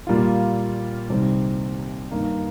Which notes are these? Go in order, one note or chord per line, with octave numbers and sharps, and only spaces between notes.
A#2 G3 A#3 F4
C2 C3 D#3 G3 C4
G2 D#3 A#3